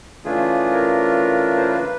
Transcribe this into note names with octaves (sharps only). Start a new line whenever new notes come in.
C#3 E3 A3 D4 F4 G#4
A#4
C5
B4